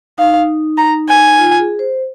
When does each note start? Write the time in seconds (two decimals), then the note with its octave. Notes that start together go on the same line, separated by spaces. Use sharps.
0.18 D#4 F5
0.78 A#5
1.09 G#5
1.38 F4
1.59 G#4
1.79 C5